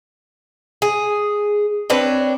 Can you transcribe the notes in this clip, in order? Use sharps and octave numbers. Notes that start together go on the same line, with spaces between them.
G#4
C4 D4 B4 C#5